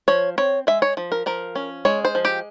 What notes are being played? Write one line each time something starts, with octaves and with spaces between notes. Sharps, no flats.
F3 C#5
C4 C#5
G#3 E5
C#5
F3
A#4
F3 A#4
C#4
G#3 C#5
C5
F3
G4